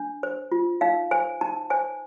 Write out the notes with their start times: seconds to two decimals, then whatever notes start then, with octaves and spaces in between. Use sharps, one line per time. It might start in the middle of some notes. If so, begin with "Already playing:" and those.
Already playing: D4
0.23 C5
0.52 F4
0.81 D#4 F5
1.11 C5 G#5
1.41 D#4 A5
1.70 C5 G#5